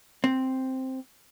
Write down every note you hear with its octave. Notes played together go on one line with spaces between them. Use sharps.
C4